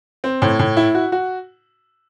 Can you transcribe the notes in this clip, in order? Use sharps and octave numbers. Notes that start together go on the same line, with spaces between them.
C4
A2
A2
E4
F#4
F#4